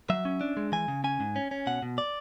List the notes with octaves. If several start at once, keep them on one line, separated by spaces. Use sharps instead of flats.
F#3 E5
C#4
D4
G#3
E3 G#5
C#3
C#4 G#5
G#2
C#4
C#4
B2 F#5
B2
D5